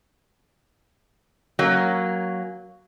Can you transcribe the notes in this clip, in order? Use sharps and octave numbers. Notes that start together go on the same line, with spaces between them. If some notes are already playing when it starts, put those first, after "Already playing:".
F#3 A#3 C#4